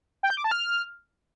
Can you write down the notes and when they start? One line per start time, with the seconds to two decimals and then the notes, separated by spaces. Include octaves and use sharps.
0.23 G5
0.30 G6
0.37 D6
0.44 A5
0.51 F6